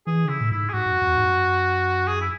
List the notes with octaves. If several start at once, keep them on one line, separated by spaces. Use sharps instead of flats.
E3 G#4
D3
C#3 E4
A2
G#2 E4
G#4
G#2 F#4
G#2
F#2
F#2
E2
G#2
F#2
G#4
E4